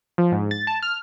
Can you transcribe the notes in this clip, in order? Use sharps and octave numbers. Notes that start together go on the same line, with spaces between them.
F3
G#2
A6
A5
F6